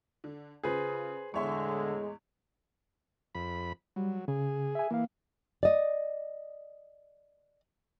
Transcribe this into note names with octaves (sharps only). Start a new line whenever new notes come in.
D3
C#3 F4 G#4 B4 C5
E2 A2 D3 G#3 C#5 E5 C6 C#6
F2 B5
F#3 G3
C#3 G#4
E5 G#5
E3 A#3 F5
D5 D#5